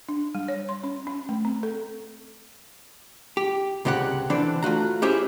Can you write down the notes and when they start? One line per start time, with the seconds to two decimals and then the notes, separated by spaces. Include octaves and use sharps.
0.09 D4
0.35 G3
0.48 C#5
0.69 C6
0.84 C#4
1.07 C#4
1.29 A3
1.45 C4
1.63 A4
3.37 G4
3.85 C2 C#3 C4 G4 F#5
4.30 D3 E3 C4 D4
4.63 A3 F4 F#4 A#5
5.02 C#4 E4 G4 G#4 C5 C#5